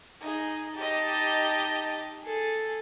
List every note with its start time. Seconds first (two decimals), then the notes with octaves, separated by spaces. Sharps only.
0.20 D#4 G#4
0.76 D#4 G4 D#5 A5
2.23 G#4 A4